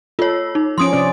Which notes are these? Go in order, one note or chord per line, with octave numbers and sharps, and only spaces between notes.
F4 A4 C#5
D#4
F3 C#4 C6 D#6 D7
C3 C#4 D5